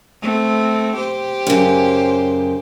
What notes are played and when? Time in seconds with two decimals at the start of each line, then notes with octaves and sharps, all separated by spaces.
0.22 A3 C4
0.96 G4 C5
1.47 F#2 C#3